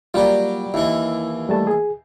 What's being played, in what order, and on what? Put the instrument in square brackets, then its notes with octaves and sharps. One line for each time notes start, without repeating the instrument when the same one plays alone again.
[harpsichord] F#3 G3 [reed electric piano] A#3 F4
[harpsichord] D#2 E3 [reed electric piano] E4
[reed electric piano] G3 A3 A5
G#4